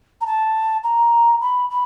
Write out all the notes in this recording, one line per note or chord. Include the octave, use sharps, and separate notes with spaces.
A#5
A5
A#5
B5
B5